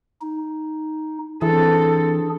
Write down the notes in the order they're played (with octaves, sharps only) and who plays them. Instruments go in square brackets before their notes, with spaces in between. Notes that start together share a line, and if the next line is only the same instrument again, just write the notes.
[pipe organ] D#4
[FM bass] E3 [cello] C4 A4 [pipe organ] D4 G#4